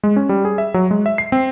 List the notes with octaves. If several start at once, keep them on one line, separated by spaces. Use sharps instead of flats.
G#3
C#4
G3
G#4
E5
F#3
G#3
E5
C7
C4